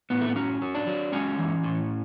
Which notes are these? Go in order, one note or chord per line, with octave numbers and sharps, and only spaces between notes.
A2 B3
A3
B3
F#3 C#4
F#3
D4
F#3
G#3 C#4
E3
A2